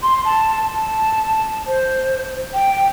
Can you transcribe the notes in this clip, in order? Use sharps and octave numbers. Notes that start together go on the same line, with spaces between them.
C6
A5
A5
C5
G5